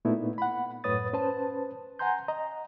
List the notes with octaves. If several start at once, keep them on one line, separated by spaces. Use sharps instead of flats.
A#2 A3 B3 D#4 E4
F#5 B5
F#2 A2 B4 C#5 D#6 A6
C#4 B4 C5 A5
F#5 G#5 A#5 C6 G6
D#5 A#5